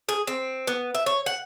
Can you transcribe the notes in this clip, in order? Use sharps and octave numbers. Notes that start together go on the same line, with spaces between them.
G#4
C4
B3
E5
C#5
F#5